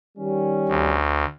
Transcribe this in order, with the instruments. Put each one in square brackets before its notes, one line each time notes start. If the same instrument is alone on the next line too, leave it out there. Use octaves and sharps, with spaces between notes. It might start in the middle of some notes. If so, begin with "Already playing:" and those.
[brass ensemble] D#3 G3 C#4
[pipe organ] D2